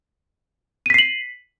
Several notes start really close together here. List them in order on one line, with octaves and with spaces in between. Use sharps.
D#7 B6 C7 F#7